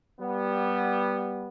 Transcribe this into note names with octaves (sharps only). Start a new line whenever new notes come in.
G3 B3